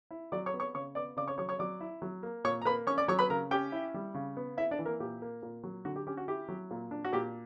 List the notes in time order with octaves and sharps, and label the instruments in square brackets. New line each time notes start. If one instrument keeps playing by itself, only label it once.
[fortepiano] E4
F#3 D5 D6
C#5 C#6
B3
C#5 C#6
C#3 C#5 C#6
B3 D5 D6
C#3 D5 D6
C#5 C#6
F#3 C#5 C#6
C#5 C#6
F#3 D5 D6
E4
F#3
A#3
A#2 C#5 C#6
A#5
A#3 B4 B5
C#4 C#5 C#6
D5 D6
F#3 C#5 C#6
B4 B5
C#3 A#4 A#5
C#4 G4 G5
E4
G3
C#3
B3
E4 E5
D4 D5
E3
A#3 A#4
A#2 G4
A#3
A#2
F#3
D3 F#4
G4
C#4 G4
F#4
E4 G4
F#3
A#2
D4
F#4
A#2 G4